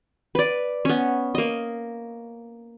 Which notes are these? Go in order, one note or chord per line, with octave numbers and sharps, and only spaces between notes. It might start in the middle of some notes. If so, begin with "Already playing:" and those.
B4 D5
B3 C#4
A#3 D#5